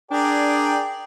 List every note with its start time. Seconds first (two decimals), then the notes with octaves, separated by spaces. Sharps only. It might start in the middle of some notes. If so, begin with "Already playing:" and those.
0.11 D4 G#4 A#4 D5 G5